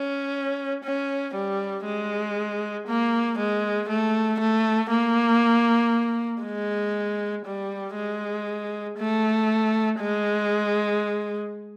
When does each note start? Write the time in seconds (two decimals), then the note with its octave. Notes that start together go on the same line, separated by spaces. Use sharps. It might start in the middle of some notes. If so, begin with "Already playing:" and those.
Already playing: C#4
0.84 C#4
1.35 G3
1.85 G#3
2.88 A#3
3.38 G#3
3.89 A3
4.40 A3
4.90 A#3
6.43 G#3
7.46 G3
7.95 G#3
8.98 A3
10.00 G#3